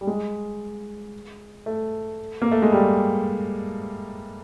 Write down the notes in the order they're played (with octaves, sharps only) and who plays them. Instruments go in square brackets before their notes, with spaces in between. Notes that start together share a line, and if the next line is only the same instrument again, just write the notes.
[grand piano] G3
G#3
A3
A#3
A3
G#3
G3